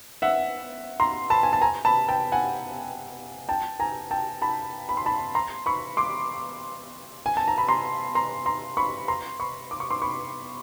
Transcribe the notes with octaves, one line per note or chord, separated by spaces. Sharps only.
E5 F#5
A#5 C6
A5 B5
G#5
A5
G#5 A#5
A5 B5
G5 A5
F#5 G#5
G5 A5
G#5 A#5
G5 A5
A5 B5
B5
C6
A5 B5
A#5 C6
B5 C#6
C6 D6
G#5
A5
A#5
B5
A#5 C6
A#5 C6
A#5 C6
B5 C#6
A#5 C6
B5 C#6
D6
C#6
C6 D6
B5 C#6